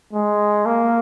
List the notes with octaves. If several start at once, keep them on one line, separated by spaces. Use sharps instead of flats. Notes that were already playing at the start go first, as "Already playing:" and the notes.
G#3
A#3